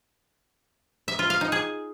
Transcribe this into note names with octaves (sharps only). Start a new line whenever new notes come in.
E5
F4
F5
D#4
G#4